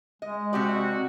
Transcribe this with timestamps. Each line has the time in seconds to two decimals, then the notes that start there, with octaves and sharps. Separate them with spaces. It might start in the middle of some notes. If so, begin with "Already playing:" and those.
0.22 G#3 D#5
0.53 C3 C4 F#4 G4 D5